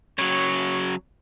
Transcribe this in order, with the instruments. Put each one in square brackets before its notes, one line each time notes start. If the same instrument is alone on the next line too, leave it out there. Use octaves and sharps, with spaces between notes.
[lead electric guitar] C#3 F#3 [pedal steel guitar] C#5